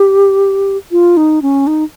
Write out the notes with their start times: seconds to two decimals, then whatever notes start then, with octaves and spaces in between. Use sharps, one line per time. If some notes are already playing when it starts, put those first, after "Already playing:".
Already playing: G4
0.91 F4
1.17 D#4
1.42 C#4
1.67 D#4